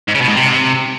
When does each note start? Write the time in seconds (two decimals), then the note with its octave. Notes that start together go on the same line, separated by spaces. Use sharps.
0.08 G#2
0.15 C#3
0.21 B2
0.28 G#2
0.35 C3